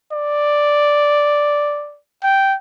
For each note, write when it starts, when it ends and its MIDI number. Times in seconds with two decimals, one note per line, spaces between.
0.12 1.98 74
2.23 2.55 79